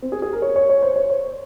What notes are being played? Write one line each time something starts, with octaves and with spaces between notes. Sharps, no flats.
C4
G#4
G#4
A#4
C#5
C#5
C#5
C5
C#5
C5